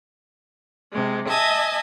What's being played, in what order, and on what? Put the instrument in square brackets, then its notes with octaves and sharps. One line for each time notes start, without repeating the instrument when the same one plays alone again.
[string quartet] C3 G#3
D#5 E5 G#5 A5